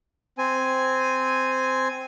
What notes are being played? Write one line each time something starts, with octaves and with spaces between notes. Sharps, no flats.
C4 G#5